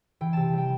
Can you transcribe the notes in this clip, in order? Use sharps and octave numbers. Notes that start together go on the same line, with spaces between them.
E3 G5
C3 A5
G3 G5